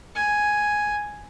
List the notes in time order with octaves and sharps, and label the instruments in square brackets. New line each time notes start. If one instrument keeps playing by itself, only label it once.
[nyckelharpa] G#5